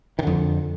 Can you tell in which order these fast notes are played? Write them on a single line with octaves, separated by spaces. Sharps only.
D#3 D3 F2